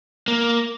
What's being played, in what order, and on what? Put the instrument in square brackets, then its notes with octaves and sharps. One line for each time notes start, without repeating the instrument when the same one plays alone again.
[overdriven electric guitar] A#3